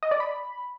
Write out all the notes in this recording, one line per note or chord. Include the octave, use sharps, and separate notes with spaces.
D#5
D5
B5